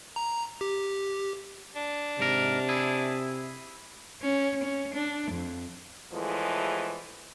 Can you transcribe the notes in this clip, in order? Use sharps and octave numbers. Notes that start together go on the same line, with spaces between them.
A#5
G4
D4
G#2 C3 A#4
E4 G#4
C#4
C#4
D4
F2
E2 A2 E3 F3 G#3